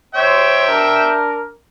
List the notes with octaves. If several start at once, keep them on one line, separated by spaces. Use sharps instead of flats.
C5 C#5 E5 G5
D4 A#4